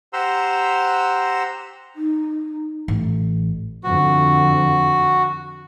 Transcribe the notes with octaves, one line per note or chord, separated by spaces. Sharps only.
G4 C5 F#5 A#5 C6 E6
D#4
A1
F2 D3 F#4